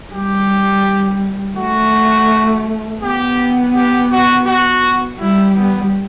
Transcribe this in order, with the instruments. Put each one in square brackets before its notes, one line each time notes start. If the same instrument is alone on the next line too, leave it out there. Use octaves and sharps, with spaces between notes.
[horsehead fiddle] G3 [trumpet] G4
[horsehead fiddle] A3 [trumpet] F#4
[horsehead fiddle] B3 [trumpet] G4
[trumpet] G4
F#4
F#4
[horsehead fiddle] G3 [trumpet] E4
[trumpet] B3